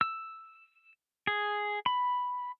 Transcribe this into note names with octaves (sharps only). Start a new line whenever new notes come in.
E6
G#4
B5